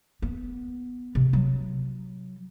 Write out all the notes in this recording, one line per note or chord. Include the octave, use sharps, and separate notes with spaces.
B3
C3
F#3